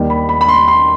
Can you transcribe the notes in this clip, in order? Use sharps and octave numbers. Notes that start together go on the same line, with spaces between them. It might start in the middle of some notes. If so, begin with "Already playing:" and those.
Already playing: D#2 D#3 G3
B5
B5
B5
C6
C6